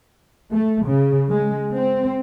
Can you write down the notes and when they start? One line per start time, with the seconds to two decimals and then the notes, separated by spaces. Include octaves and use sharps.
0.51 A3
0.86 C#3
1.30 G#3
1.74 C4